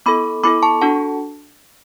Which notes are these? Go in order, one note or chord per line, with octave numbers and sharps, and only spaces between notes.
B3 E4 A4 B5 D6
B3 E4 A4 B5 D6
A5 C#6
D4 F#4 A4 F#5 A5